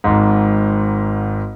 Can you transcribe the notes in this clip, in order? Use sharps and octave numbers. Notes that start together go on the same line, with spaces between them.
G#1 G#2